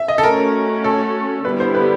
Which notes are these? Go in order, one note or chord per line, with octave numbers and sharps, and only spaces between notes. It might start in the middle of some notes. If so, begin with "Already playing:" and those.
Already playing: E5
D#5
A4
A3 C#4 F#4 A#4
A4
D3 G3 B3 E4 G4 B4
C5
B4